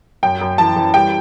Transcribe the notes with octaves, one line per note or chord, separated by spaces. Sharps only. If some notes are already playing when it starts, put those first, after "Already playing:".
F#2 G5
F#2
E3 A5
E3
G3 G5